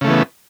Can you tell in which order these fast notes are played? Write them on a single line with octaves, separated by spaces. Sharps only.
C#3 A3 E3 B3